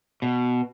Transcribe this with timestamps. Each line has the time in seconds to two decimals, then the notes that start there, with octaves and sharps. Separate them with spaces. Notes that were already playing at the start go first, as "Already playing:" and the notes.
0.22 B2